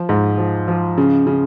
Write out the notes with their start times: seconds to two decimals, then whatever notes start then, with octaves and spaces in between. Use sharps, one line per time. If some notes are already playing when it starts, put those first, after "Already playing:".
Already playing: F3
0.09 G#2
0.38 F3
0.68 F3
0.98 C#3
1.27 C#3